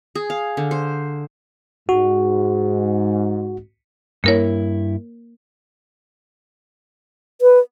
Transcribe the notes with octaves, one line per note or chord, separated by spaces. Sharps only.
G#4
F5
D3
C5
G#2 F#4
G2 A#3 E4 A#4 C#5
B4